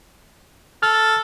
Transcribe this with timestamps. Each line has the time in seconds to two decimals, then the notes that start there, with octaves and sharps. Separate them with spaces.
0.83 A4 F6